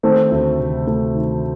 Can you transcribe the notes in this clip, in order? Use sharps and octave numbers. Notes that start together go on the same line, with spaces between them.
D#3 A3 C4
D2
C3
A3
D#3